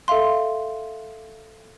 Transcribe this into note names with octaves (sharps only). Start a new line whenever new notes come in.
A4 E5 F5 C6